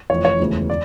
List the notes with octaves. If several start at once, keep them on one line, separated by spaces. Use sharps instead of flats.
F1 F2 E3 C#5
C#5
E1 D2 C#3 E3
D5